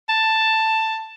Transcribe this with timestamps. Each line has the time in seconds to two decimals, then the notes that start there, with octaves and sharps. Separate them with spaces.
0.09 A5